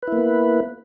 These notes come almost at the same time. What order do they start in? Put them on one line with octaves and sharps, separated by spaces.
B4 E4 A#3 B3